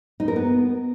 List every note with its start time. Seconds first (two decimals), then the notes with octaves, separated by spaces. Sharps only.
0.20 D#4
0.28 A#4
0.36 B3